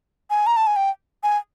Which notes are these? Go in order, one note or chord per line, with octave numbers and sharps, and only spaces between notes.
G#5
A#5
A5
G#5
G5
G#5